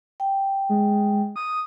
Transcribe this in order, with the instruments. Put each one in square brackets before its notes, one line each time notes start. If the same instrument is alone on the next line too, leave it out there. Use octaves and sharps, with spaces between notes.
[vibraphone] G5
[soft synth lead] G#3
D#6